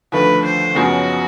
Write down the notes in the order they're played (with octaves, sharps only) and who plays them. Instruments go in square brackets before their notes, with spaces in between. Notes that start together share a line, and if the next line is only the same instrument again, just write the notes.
[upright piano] D#2 D3 F3 A3 [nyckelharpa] B4
[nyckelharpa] C5
[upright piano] F#2 C#3 F3 G#3 B3 [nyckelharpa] F#4